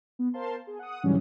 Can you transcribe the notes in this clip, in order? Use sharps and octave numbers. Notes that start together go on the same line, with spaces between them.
B3
A#4 C5 F5 A5 C6
G#4
F#5 D#6
G#2 D3 E3 F#3 G3 C#4